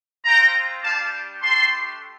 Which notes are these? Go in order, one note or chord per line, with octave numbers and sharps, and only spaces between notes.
C4 F4 G5 A#5
G3 D4 G4 F5 A5
A3 D4 G4 A5 C6